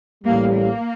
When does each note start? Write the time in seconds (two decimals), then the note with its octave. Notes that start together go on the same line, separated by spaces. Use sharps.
0.24 A1 A2 G3 A#3
0.53 A#3